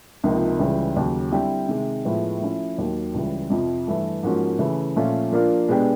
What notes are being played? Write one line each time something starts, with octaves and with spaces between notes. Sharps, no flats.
C#2 C3 F3 A#3 D#4
C#2 C#3 E3 G3
D#2 C#3 F#3
D3 G3 C4 E4 G4
C3 D#3 G#3
A2 F3 G#3 B3 E4
F3 A3 C#4 E4
D#2 D#3 F#3 A#3
C#2 C#3 E3 G3
F2 C3 F3
G2 E3 A3
G#2 F3 A#3 C#4 F#4
C#3 E3 A3
A#2 F3 A3 C#4 F4
F3 A#3 D4 F4 A#4
B2 G#3 B3 D4 G4